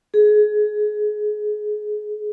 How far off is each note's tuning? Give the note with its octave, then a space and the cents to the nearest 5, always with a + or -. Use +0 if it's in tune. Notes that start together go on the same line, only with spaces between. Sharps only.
G#4 +25